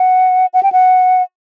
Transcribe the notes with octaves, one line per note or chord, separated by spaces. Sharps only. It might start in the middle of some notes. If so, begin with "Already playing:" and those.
Already playing: F#5
F#5
G5
F#5